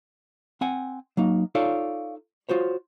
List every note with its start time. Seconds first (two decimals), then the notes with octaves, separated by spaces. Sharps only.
0.61 C4 F#5 G#5
1.17 F#3 A#3 D#4
1.55 D#4 F4 A4 C#5 D5 F5
2.49 F4 F#4 C5 C#5